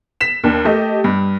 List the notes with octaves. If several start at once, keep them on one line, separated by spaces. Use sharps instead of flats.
B6 E7
D#2 D4
A3 G4 D#5
G2